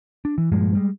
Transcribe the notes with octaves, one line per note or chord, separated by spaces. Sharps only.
D4
E3
G2 A#2 F3 G#3
G3 G#3